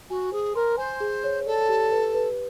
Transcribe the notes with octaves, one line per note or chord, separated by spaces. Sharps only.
F#4 G#5
G#4 C5
A#4 C6
C5 G#5
G#4
C#5
A4 D5
G4
B4
B4